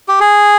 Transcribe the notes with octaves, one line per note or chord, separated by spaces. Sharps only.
G4
G#4